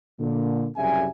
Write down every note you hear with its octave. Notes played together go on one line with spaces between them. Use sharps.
A#2 D3
C2 F#2 C#3 G3 E5 G#5